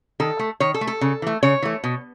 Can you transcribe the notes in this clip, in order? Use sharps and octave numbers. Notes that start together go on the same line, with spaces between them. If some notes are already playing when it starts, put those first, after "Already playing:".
D#3 A4
A3
D#3 C#5
A4
A3
A4
C#3
E3 A3
C#3 C#5
E3 A3
B2